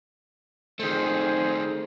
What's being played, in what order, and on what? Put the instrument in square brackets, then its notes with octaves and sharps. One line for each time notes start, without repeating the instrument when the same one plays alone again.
[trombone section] F2 G#4 C5 [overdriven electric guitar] D#3 A3